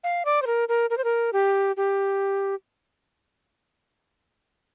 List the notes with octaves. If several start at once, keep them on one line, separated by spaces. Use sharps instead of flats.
F5
D5
C5
A#4
A#4
A#4
C5
A#4
G4
G4